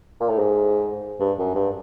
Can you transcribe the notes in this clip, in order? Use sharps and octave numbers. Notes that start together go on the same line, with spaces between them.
A#2
A2
G#2
G2
F#2
G2